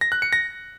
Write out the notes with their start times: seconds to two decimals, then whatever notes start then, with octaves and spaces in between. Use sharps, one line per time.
0.01 A#6
0.12 F#6
0.22 C#7
0.33 A#6